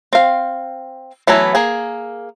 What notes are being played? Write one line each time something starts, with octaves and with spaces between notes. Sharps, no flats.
C4 F5
E3 F#3 A3 B3 E4
A#3 G#4